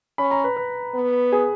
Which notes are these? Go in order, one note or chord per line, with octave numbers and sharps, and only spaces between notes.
C#4 B5
A#5
B4
B4
B3
G#4